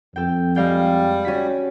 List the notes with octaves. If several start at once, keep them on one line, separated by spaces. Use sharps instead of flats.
F2 A4 G5
G3 G#3 F5 G5
C#4 F#4 B6